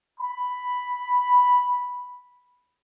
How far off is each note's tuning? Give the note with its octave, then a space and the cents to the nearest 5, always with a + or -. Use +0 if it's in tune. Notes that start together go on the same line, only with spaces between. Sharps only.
B5 +0